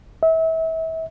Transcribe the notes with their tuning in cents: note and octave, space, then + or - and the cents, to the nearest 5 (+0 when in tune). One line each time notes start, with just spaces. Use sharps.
E5 -30